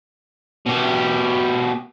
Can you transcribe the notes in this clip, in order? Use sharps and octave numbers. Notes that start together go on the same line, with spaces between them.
B2 G4